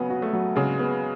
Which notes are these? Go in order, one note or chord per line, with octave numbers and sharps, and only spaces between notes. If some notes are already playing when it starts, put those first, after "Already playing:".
Already playing: C#3 F#3 B3
F#4
A3
F#3
C#3 G#3
B3